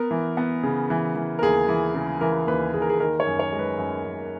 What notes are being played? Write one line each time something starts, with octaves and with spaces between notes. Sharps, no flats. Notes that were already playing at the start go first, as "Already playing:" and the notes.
Already playing: B3 A#4
E3
B3
C#3
E3
E3
A#4
D#2 G#4
E3
C#3
E3 A#4
D#2 B4
D#2 G#4
A#4
G#4
D#3 A#4
C#5
F#2
C#5
G#3
B4
F#2
F#2